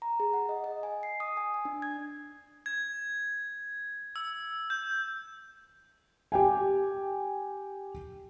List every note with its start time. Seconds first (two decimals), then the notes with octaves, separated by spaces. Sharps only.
0.02 A#5
0.20 G#4
0.33 F#5
0.49 D#5
0.64 D#5
0.83 G#5
1.03 C7
1.20 D#6
1.37 G#5
1.54 G#5
1.65 D4
1.82 G#6
2.66 G#6
4.16 E6
4.70 G6
6.32 G4 G5 G#5